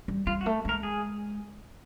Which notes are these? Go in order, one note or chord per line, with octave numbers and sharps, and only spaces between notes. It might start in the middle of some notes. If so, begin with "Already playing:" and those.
G3
G3 F4
F#4
A3
G#3 A#4
G#4